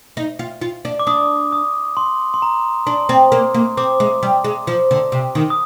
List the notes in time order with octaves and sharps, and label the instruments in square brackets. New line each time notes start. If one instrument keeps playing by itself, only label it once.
[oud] D#4
F4
F4
D4
[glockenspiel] D6
[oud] D4 [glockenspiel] D#6
[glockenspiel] D#6
C6
C6
A#5
[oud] D4 [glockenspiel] C6
[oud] C4
A#3
A#3
[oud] C4 [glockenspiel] D6
[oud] G#3
G3
G#3
F3
D3
C3
D#3
[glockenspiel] D#6